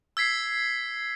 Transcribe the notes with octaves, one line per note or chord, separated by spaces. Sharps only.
E6 G#6 B6 C7